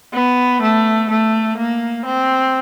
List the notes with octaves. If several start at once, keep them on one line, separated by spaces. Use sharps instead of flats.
B3
A3
A3
A#3
C4